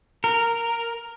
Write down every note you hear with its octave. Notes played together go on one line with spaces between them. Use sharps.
A#4